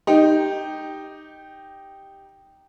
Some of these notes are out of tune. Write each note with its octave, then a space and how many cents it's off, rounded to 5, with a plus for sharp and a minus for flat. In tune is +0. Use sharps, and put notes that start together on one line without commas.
D#4 -5 G4 +0